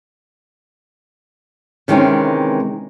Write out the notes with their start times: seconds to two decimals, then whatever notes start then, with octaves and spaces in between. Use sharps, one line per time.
1.88 C3 D#3 E3 G#3 C4 C#4